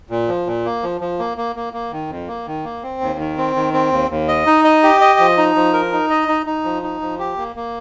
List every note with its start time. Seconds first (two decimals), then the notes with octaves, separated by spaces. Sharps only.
0.10 A#2
0.28 F3
0.47 A#2
0.65 A#3
0.83 F3
1.01 F3
1.19 A#3
1.37 A#3
1.56 A#3
1.73 A#3
1.92 D#3
2.10 F2
2.28 A#3
2.46 D#3
2.64 A#3
2.83 C4
3.01 D#2
3.19 D#3
3.37 C4
3.56 D#3
3.73 C4
3.92 D#2
4.10 D#2
4.28 D#5
4.46 D#4
4.65 D#5
4.83 G4
5.01 D#5
5.19 F3
5.37 D#4
5.56 F3
5.73 A#4
5.92 D#4
6.10 D#5
6.28 D#4
6.46 D#4
6.65 F3
6.83 D#4
7.01 F3
7.19 G4
7.37 A#3
7.56 A#3